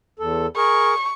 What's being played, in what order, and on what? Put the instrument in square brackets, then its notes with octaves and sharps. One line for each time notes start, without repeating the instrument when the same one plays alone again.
[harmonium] E2 A4
[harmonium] G#4 A#4 [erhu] C#6